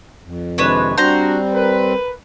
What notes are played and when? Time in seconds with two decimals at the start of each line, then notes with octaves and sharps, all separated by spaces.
0.25 F2
0.58 C3 D#3 G#3 D4 B4 C#5
0.98 G3 C4 D4 F#4 C5 A#5
1.53 A#4 B4